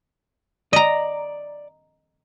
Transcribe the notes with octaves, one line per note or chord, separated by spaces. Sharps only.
D5 D#5 A#5